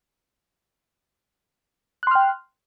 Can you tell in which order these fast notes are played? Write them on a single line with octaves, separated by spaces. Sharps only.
F#6 C6 F6 G5